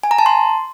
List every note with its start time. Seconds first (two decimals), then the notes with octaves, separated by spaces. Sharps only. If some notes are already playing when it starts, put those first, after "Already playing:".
0.03 G#5
0.11 A#5
0.18 A5
0.26 C6